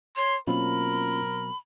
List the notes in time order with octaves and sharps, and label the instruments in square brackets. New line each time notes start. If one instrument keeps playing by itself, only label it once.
[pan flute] C#5 [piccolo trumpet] C6
[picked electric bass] B2 F#3 C4 [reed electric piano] A#3 C#4 F4 [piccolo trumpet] A#4 [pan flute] B5